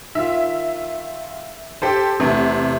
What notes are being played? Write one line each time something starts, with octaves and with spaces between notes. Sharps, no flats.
D#3 F4 E5
G4 A4 C5 C6
E2 C3 A3 B4